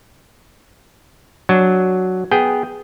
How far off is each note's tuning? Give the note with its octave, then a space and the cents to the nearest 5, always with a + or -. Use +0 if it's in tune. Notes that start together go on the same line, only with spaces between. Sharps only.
F#3 +0 D4 +0
B3 +0 G#4 +0 G5 +0